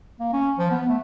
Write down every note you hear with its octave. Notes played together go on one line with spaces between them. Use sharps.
A#3
C#4
F3
B3
A3